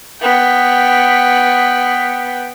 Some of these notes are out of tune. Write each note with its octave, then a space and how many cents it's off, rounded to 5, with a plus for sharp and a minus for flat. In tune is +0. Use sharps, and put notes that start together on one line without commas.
B3 +0 G5 +0